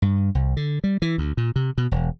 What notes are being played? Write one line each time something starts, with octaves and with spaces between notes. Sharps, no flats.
G2
C2
D3
G3
E3
D2
A#2
C3
B2
E1